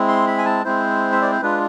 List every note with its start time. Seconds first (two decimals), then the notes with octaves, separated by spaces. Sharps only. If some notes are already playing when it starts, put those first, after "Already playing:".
Already playing: G#3 C4 E4
0.08 C6
0.27 B5
0.38 G#5
0.46 A5
0.65 G#3 C4 E4 C5
1.12 E5
1.22 D5
1.32 C5
1.42 G#3 D4 F4 B4